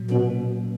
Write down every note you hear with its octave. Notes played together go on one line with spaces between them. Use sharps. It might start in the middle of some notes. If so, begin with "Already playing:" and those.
Already playing: A#2 F#3
B2 C#4
A#3